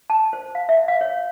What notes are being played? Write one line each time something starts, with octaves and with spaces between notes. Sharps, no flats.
A5
C5
F5
E5
F5
C#5